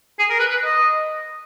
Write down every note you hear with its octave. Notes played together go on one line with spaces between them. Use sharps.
G#4
A#4
B4
B4
D#5